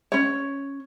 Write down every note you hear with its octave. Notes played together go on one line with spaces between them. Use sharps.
C#4 C#5